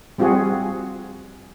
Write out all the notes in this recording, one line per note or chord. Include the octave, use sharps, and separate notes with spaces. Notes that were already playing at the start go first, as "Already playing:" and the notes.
G3 C4 F4 F#4 G#4